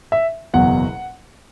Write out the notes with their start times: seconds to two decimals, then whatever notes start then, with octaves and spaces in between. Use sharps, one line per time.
0.12 E5
0.54 F#1 E2 B2 F#3 F#5